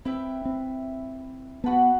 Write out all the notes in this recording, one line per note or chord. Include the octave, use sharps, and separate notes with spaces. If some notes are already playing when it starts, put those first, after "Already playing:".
C4 E4 B4 E5 G5
C4
B3 F#4 B4 F#5 A5